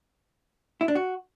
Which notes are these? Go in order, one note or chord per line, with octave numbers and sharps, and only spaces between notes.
E4
D4
F#4